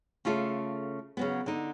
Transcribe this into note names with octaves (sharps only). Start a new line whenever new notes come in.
C#3 A3 F4 A4
C#3 F#3 B3
D3 D#4